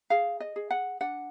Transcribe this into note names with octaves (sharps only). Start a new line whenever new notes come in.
G#4 F5
D#5
G#4
F#5
D4 F#5